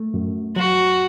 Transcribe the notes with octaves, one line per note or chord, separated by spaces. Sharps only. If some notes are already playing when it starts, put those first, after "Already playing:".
Already playing: A3
F#2
F#3 F#4